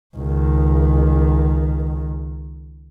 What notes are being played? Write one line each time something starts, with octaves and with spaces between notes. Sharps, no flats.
C#2 D#3